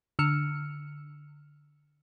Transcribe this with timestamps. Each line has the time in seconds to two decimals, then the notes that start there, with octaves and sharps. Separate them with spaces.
0.19 D3 E6 F6 C#7